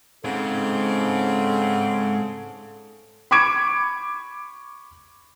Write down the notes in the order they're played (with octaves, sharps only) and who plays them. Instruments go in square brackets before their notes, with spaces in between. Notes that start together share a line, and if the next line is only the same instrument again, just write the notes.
[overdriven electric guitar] G#2 [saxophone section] C#3 C4 [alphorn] A4
[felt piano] B5 C#6 D6 G#6 D7